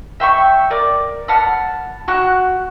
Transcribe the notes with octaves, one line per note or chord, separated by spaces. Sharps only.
E5 G5 C6 C#6
A#4 D5
F#5 A5 B5 F6
F#4 F#6